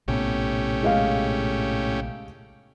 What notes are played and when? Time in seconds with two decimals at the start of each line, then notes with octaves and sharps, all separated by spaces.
0.08 A#1 A2 C3 B3 C#4 G4
0.83 G#3 D#5 F5